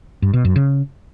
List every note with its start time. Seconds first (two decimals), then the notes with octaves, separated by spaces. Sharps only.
0.22 G2
0.33 B2
0.45 F#2
0.56 C#3